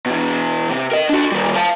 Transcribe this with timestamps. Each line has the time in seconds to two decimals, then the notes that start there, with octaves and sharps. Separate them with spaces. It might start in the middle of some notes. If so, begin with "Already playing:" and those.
0.06 B2 E3
0.70 C3
0.92 A#4 D#5
1.09 D4 F#4
1.32 D#3 G3
1.55 F5 A5